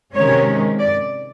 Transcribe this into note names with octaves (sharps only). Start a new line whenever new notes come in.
C3 D#3 G#3 C#4 C#5
D5